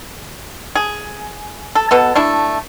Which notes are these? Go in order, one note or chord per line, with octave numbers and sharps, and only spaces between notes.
G#4
A4
B2 B3 A4
A3 D4 E4